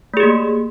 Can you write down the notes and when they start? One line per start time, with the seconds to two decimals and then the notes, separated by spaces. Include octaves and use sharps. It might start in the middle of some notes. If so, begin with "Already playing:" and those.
0.14 A3
0.17 G#4
0.20 G4
0.23 A#3